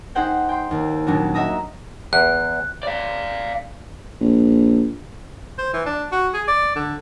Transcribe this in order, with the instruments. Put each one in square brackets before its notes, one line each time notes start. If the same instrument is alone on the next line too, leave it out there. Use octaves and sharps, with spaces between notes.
[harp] D#4 G#4 C5 F#5 G5
G5 C6
D#2
D#1 F#3 D4 F#4
F#4 D#5 E5 A#5 D#6
[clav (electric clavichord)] E2 [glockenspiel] F#6
[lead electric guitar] D5 F5
[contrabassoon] A#1
[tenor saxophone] C5
E3
D4
F#4
G#4
D5
D3